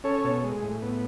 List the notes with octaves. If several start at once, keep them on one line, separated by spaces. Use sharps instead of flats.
C#4 A4 C#5
B2
G#3
A2
B3